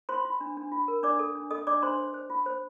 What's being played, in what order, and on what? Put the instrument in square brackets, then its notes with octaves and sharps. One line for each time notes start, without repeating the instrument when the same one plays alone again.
[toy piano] F4 C5 C6
F4
D4
D4
F4
A#4
D4 D5 D6
A4
D4
A4 D#5 D#6
D4 D5 D6
D4 C5 C6
C5
C5
F4
C5